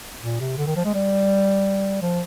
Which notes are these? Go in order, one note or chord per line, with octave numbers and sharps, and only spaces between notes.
A#2
C3
D3
D#3
F3
G#3
G3
F3